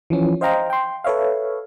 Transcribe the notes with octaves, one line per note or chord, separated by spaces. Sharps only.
E3 F3 C#4
C5 D#5 F5 G5 A#5
G5 C6
A4 B4 C#5 E5 F5